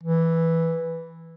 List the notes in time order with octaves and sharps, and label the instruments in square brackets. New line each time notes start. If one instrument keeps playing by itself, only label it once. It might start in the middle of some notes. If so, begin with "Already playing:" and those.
[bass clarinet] E3